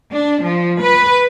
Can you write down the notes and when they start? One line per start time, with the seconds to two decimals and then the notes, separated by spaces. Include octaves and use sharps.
0.12 D4
0.42 F3
0.80 B4